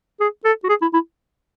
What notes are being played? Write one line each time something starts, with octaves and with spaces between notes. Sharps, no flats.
G#4
A4
F#4
G#4
E4
E4